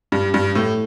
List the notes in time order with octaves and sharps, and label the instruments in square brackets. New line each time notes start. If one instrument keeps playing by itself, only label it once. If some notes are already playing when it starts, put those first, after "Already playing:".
[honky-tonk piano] G2 [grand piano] G4
[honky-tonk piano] G2 [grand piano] G4
[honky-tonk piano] A2 [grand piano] A3